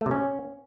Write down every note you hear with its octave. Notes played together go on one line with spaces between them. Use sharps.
A3
C3
C#4